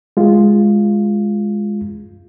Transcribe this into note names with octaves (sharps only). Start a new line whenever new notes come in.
G#3 F4